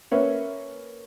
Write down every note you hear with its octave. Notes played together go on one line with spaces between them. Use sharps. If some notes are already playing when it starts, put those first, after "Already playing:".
A#3 C#4 B4 C#5 E5